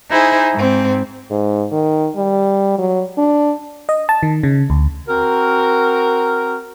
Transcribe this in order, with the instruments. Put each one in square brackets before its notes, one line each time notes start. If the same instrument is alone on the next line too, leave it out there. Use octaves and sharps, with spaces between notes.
[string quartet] D#4 E4 G#4 C5
G#2 C4
[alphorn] G#2
D#3
G3
F#3
D4
[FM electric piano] D#5
A5
D#3
C#3
D2
[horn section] C4 F#4 A#4